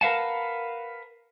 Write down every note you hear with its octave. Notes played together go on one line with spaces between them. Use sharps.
A#4 B4 F5 F#5 A5